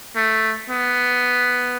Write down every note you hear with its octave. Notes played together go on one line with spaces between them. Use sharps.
A3
B3